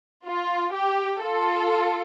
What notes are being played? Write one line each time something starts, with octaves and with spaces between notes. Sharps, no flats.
F4
G4
F4 A4